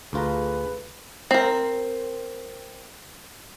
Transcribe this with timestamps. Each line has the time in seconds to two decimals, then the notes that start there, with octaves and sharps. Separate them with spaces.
0.13 D2 F4 G#4 A4 B4 A#5
1.31 C4 A#4